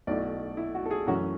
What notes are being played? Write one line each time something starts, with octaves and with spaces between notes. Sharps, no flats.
B1 B2 A3 E4 D5
E4
F#4
A4
G#4
F#2 E3 A3 C#4 F#4